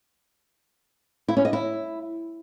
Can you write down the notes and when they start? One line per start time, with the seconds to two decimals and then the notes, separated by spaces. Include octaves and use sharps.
1.28 E4
1.37 C#4
1.45 D#5
1.53 E4